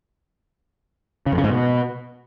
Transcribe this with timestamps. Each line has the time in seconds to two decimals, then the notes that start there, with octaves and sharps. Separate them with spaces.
1.26 C#3
1.32 F2
1.38 C#3
1.44 G#2
1.50 B2